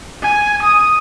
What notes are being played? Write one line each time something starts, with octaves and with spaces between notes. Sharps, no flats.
G#5
D#6